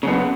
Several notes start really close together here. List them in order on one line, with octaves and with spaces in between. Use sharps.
C#3 F#2 B3